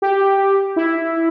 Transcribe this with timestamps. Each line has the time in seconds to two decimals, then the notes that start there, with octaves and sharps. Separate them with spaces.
0.02 G4
0.76 E4